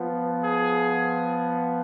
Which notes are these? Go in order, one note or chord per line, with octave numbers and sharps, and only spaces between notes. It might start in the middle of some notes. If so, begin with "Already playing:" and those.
Already playing: F3 B3
G#4